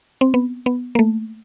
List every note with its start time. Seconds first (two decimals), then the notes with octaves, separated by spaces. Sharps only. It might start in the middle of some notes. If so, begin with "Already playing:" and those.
0.21 C4
0.34 B3
0.66 B3
0.95 A#3
0.99 A3